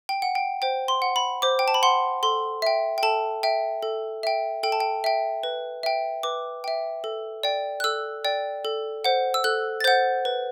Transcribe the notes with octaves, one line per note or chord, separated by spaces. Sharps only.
G5
F#5
G5
C5 G5
C6
F#5
B5
C5 D6
G5
A5
B5
F#5 C6
A4 C6
E5 G5
G5
A4 A5
E5 G5
A4
E5 G5
A4 G5
A5
G5
E5 G5
B4
E5 G5
B4 D6
E5 G5
A4
D5 G5
F#6
A4 E6
D5 G5
A4
C5 F#5
E6
A4 F#6
A6
C5 F#5 G6
B4